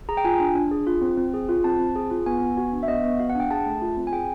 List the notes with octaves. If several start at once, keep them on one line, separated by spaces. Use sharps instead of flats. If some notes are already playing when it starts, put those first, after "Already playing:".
G#4 A#5
G5
F4 G#5
D4
D4
G#4
F4
C4
C4
G#4
F4
C4 A5
C4
G#4
F4
B3 G#5
B3
F#4
D4
E5
B3 D#5
B3
F#4 F5
F#5
D4 G5
G#4 A5
A3
F4
C4
G#5
G#4 G5